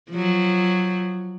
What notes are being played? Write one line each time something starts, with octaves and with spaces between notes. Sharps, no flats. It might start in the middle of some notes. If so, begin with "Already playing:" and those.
F3 F#3